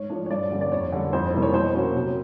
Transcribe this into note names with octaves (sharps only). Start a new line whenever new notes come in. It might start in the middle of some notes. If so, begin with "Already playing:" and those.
Already playing: G#2 C#5
F3 A3 D4
C#5
G2 D5
D3 G3 A#3 C#4
D5
F2 C#5
D3 G3 A#3
F2 C5
C3 E3 G3 A#3
C#5
B2 C5
F#3 A#3 C#4
C3